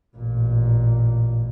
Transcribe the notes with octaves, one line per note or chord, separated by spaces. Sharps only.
A1 A#2